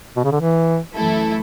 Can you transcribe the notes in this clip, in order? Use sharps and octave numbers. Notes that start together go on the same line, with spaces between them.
B2
C#3
D3
E3
F#2 E3 A3 E4 A4